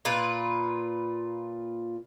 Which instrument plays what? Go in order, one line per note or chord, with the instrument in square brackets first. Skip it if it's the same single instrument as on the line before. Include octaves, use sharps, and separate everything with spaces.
[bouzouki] A#2 F4 B4